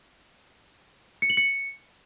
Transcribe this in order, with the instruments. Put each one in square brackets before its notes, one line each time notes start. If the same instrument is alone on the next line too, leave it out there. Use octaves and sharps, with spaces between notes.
[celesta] C#7
F#7
C#7